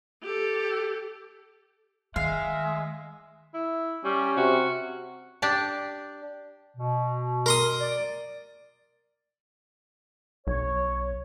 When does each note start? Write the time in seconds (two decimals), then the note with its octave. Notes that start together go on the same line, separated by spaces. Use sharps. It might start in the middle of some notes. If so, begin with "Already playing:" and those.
0.23 G4 A4
2.16 D#3 G#3 E5 F5
3.54 E4
4.04 G3 C#4
4.37 C3 F#4
5.42 D4 G4 D5 A5
6.77 B2
7.46 A#4 C6 D#6
7.80 D5
10.47 B1 C#5